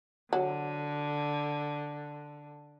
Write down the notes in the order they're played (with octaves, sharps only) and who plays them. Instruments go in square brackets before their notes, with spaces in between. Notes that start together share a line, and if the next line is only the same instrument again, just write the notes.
[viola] D3 [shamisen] F#3